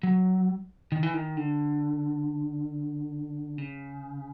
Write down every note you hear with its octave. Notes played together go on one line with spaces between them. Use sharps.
F#3
D#3
E3
D#3
D3
C#3